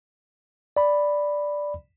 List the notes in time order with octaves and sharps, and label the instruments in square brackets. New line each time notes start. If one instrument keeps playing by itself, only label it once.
[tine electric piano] D5 B5